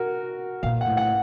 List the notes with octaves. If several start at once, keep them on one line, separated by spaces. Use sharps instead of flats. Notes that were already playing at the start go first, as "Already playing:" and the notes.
Already playing: F#4 A#4
A#2 F5
F#5
A2
F#5